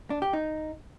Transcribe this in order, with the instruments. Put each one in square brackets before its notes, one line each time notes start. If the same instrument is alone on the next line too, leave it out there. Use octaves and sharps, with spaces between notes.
[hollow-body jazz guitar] D4
G4
D#4